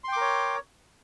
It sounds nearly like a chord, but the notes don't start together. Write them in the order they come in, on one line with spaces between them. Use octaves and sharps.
C6 G5 D6 A#4 C#5